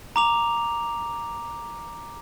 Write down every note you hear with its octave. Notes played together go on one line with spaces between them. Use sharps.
A#5 D6 F7